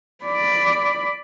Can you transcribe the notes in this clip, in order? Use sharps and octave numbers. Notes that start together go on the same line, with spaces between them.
D5 B5